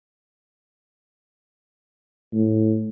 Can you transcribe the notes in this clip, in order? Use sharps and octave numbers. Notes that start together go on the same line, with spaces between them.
A2